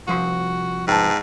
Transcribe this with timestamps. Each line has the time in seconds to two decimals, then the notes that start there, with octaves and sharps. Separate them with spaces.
0.08 C2 F3 F#4 C6
0.88 G#2 B3 G5 A5